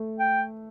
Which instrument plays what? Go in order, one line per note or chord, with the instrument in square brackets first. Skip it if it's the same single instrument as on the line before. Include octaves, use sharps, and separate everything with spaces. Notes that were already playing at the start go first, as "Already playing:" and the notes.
Already playing: [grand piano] A3
[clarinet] G5